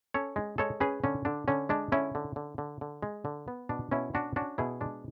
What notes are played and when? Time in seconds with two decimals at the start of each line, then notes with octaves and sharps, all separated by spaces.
0.14 C#4 A4 C#5
0.36 G#3
0.58 G#3 A4 C#5
0.80 C#4 G#4 B4
1.04 D3 C#4
1.25 D3 D4
1.48 D3 C#4
1.69 G#3 D4
1.92 D3 C#4 E4
2.15 D3
2.36 D3
2.58 D3
2.81 D3
3.02 G#3
3.25 D3
3.48 B3
3.69 B2 D4
3.91 B2 C#4 E4
4.14 C#4 D4 F#4
4.36 C#4 D4 F#4
4.58 B2 E4 G#4
4.81 G#3 D4